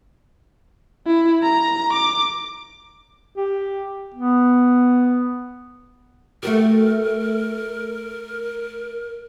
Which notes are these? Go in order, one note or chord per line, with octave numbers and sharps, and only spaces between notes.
E4
A#5
D6
G4
B3
A3 F#4 G4 A#4